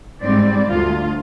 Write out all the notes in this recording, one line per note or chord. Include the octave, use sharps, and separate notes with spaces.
G#2 G3 C4 D5
D2 F4